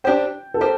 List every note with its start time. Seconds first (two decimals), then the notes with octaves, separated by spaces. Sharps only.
0.04 D4 G4 C5 G5
0.54 A4
0.61 G4 A#4 C5